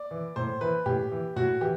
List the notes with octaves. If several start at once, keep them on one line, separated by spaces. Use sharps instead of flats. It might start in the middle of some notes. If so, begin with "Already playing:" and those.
Already playing: D5
E3
A2 C5
E3 B4
A2 G4
E3
A2 F#4
E3 G4